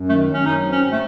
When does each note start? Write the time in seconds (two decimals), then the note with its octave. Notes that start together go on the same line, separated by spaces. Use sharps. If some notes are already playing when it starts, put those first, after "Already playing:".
Already playing: F#2
0.09 D#3 A3
0.27 F#3
0.34 C#4
0.45 F#3 D#4
0.63 C4
0.72 C#4
0.81 G#2
0.92 A3